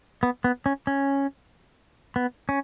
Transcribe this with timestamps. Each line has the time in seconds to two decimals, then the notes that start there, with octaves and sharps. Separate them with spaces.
0.23 B3
0.44 B3
0.66 C#4
0.87 C#4
2.16 B3
2.49 C#4